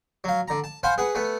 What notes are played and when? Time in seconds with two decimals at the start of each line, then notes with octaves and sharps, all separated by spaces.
0.24 F#3 F5
0.48 D3 A#5
0.64 A5
0.83 C5 F5 F#5 G#5 B5 C6
0.98 G#4 B4 F#5
1.15 A3 B3 B4